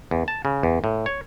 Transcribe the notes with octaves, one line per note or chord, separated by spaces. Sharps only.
E2
A5
C#3
E2
A2
C#5